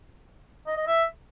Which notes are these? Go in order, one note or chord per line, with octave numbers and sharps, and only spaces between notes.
D#5
D#5
E5